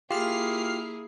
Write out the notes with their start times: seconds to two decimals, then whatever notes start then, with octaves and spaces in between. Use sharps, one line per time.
0.11 A#3 E4 F4 G4 G#4 F6 C7